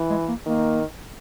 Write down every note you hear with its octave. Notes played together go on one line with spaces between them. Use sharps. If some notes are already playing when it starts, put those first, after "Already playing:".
Already playing: E3
G#3
A#3
D#3 A#3